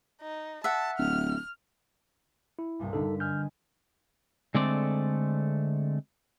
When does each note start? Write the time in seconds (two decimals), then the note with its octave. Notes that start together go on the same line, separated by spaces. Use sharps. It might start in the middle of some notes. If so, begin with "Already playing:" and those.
0.22 D#4
0.64 E5 F#5 A5
0.99 D1 F6
2.59 E4
2.79 C2 G2 A#2
2.93 D3 D4 D#4 A4 B5
3.20 D#5 G#5 F6 G6
4.54 D3 G#3 A3 C4 D5